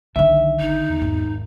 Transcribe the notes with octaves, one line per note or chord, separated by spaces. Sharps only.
B1 D3 D#3 E5
G#1 D#4
E2
G#1